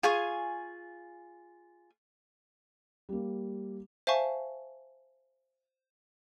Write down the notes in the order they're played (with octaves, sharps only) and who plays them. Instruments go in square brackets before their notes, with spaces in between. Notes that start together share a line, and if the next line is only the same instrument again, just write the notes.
[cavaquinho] F4 G#4 G#5 C#6
[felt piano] G3 A#3
[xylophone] C5 E5 F5 G#5 A5 C#6